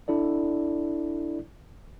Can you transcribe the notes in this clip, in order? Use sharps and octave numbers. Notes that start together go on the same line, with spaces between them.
D4 E4 A4 D5